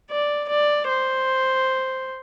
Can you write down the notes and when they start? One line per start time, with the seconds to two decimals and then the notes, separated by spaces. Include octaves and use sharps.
0.11 D5
0.49 D5
0.88 C5